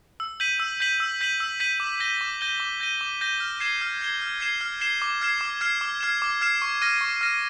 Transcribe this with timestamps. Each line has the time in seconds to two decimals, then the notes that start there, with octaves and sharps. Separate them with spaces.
0.20 E6
0.40 G6 B6 D#7 F#7
0.60 E6
0.80 G6 B6 D#7 F#7
1.00 E6
1.21 G6 B6 D#7 F#7
1.40 E6
1.60 G6 B6 D#7 F#7
1.80 D6
2.00 G6 A#6 D#7 G7
2.21 D6
2.41 G6 A#6 D#7 G7
2.60 D6
2.80 G6 A#6 D#7 G7
3.01 D6
3.21 G6 A#6 D#7 G7
3.40 F6
3.60 G#6 C7 E7 G7
3.81 F6
4.01 G#6 C7 E7 G7
4.21 F6
4.40 G#6 C7 E7 G7
4.61 F6
4.80 G#6 C7 E7 G7
5.02 D6
5.21 F6 G#6 C7 E7
5.41 D6
5.61 F6 G#6 C7 E7
5.81 D6
6.01 F6 G#6 C7 E7
6.22 D6
6.41 F6 G#6 C7 E7
6.62 C#6
6.82 F6 A#6 D#7
7.01 C#6
7.21 F6 A#6 D#7